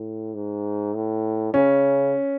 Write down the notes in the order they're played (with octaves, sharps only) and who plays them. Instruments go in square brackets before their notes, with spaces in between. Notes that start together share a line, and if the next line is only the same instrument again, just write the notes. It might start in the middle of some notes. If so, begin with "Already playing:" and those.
Already playing: [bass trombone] A2
G#2
A2
[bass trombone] C#3 [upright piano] C#4